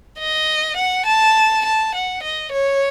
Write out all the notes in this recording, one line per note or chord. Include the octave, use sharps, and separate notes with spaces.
D#5
F#5
A5
A5
F#5
D#5
C#5